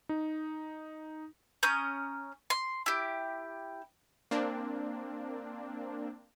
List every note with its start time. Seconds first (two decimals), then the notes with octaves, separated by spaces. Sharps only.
0.09 D#4
1.63 C#4 A#5 D#6 G6
2.50 C6
2.86 E4 G4
4.31 A#3 C4 D4